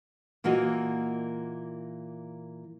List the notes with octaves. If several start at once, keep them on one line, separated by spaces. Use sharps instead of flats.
A#2 E3 A#3 F4 F#4 D#5